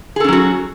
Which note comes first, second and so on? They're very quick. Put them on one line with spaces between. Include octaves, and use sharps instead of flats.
G#4 A4 C#4 F#3 F#4